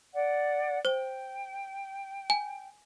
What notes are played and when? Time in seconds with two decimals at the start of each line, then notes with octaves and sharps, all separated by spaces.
0.13 D5 F#5
0.85 C5 G5 G7
2.30 G#5